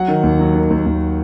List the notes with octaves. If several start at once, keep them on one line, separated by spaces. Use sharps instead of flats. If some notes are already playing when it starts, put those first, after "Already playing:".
Already playing: F#3 F#5
D#3
D#2
F#3
D#3
D#2
D#2